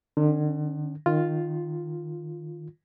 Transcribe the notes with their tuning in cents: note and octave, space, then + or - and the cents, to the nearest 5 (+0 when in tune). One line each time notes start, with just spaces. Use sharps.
D3 +45 C#4 +0
D#3 -15 F4 +0